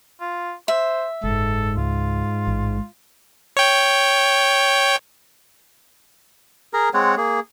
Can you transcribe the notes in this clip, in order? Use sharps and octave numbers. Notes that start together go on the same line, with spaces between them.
F4
C5 E5
F#1 G#2 A4
C#2 F4
A1
C#5 G5
G#4 A#4 A#5
G#3 C4 C#5 F#5
A#3 G#4